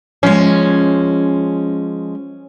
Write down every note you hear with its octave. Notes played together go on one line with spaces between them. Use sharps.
F3 G#3 C#4